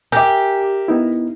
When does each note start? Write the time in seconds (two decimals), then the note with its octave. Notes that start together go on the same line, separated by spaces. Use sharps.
0.12 G4 A#4 E5 G#5 D6
0.88 B3 D#4 E4